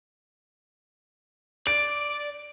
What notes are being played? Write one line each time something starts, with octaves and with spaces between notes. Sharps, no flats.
D5 D7